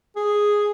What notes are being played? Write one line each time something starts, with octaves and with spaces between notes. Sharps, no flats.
G#4